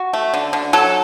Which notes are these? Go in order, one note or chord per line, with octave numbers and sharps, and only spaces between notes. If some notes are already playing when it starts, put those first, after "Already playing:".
Already playing: F#4
A3
D3
D3
F#3 A4